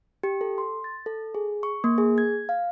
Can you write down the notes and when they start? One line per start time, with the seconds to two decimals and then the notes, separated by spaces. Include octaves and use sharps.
0.23 G4
0.41 A4
0.58 C6
0.84 A6
1.06 A4
1.35 G#4
1.63 C#6
1.84 A#3
1.98 G#4
2.18 G#6
2.49 F5